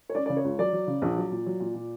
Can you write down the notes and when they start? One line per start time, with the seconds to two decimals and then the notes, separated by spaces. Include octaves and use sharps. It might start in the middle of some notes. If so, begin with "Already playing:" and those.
0.09 C#5
0.15 C#4 D5
0.26 C#3 D5
0.37 C#5
0.44 C#2
0.59 F#3 D5
0.73 F#3
0.87 C#3
1.02 A#1
1.17 F#3
1.31 A#2
1.46 F#3
1.60 A#2
1.75 A#2